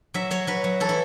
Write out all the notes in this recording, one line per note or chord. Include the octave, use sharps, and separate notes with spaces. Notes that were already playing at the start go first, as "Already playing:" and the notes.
F#3 E5
F#3 C#5
F#3 B4
F#3
E3 A4
E4